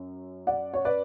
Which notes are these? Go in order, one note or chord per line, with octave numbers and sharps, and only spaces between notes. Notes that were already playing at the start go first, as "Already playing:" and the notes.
Already playing: F#2
D5 F#5
C#5
B4 D5